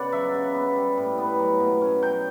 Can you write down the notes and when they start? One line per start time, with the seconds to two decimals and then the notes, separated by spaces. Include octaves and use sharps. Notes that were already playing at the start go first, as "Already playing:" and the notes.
Already playing: C#3 B3 D5 F#5
0.12 F#3 E5
0.34 C#3
0.55 B3
0.75 G3
0.97 A2
1.18 B3
1.39 F#3
1.60 B2
1.81 C#4
2.02 F#3 G5